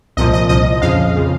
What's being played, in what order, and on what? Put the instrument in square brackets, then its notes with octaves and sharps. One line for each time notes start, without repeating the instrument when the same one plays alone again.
[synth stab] C2 A#2 F3 D#5
D#5
C2 A#2 F3 D#5
F2 C#3 F3 F5
C#3 F3